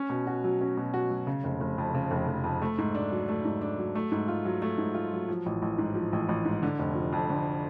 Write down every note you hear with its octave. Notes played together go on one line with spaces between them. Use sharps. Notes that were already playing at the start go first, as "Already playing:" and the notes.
Already playing: C#4
B2
F#4
F#3
C#4
B2
F#4
F#3
C#3
F1
F1
F2
C#3
F1
F1
F2
A3
G#2
D4
F#3
A3
G#2
D4
F#3
A3
G#2
F4
F#3
A3
G#2
F4
F#3
F3
A1
A1
G#2
F3
A1
A1
G#2
D3
F1
F3
F2
D3